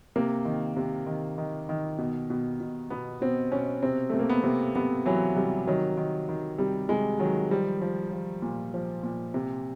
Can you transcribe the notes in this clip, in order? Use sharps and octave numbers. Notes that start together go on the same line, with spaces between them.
C3 A#3
D#3
C3
D#3
D#3
D#3
B2
B2
B2
B2 B3
B2 C4
B2 C#4
C3 C4
C3 A3
A#3
B3
C3
C3 B3
E3 F#3
C3 G3
D#3 F#3
D#3
D#3
C3 G3
C3 G#3
D#3 F#3
F3 G3
F3
F3
A#2
F3
A#2
C3